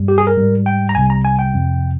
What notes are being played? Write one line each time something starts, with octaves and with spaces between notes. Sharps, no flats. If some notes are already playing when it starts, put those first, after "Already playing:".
Already playing: G2 G3
G4
G#4
A#4
G#2 G3
G5
A#5
C2 C3 G3 G#5
A#5
G#5
G5
F2 C3 F3